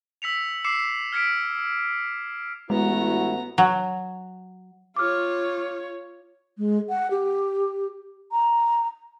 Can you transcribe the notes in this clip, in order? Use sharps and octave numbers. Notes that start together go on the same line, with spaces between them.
E6 B6 C#7 F7
D6 E6 C7 C#7 E7
F6 G#6 B6 C#7 D7
A1 G#3 B3 E4 F#4 A#5
F#3
F4 C#5 D6 F6
G#3
F#5
G4
A#5